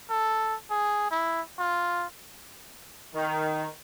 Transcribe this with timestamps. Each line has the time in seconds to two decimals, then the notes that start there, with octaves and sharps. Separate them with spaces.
0.10 A4
0.71 G#4
1.11 E4
1.59 F4
3.14 D#3